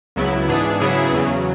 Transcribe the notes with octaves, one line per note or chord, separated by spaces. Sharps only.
C#2 C#3 F#3 B3 E4
G#2 E3 B3 D4 G#4
C#3 F#3 B3 E4 G#4
E2 C#3 F#3